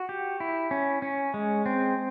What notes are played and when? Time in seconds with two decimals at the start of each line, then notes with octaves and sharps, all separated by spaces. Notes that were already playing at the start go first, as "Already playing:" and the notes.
Already playing: F#4
0.09 G4
0.40 E4
0.71 C#4
1.02 C#4
1.34 G#3
1.66 C4